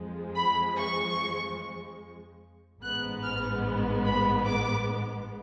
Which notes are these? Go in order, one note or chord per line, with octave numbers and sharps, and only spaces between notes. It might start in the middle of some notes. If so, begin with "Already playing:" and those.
Already playing: F2 F3 G#3
B5
C#6
A1 G#2 G#3 B3 F#6
F6
B5
D6